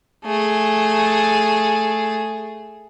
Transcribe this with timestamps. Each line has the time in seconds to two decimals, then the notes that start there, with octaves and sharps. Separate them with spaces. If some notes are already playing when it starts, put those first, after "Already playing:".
0.25 A3 G#4